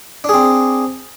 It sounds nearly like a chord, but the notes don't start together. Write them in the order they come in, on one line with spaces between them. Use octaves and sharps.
D4 G#4 C4